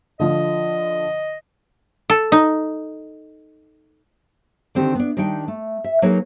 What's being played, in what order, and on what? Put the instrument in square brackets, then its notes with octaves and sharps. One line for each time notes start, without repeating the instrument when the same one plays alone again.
[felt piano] D3 F3 [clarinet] D#5
[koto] A4
D#4
[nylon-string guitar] D3 D#3 C4 D#4 G4
B3 D4
D#3 G3 D4 D#4 G5
A3
E5
F#3 A#3 D#4 G#4 A#4 B4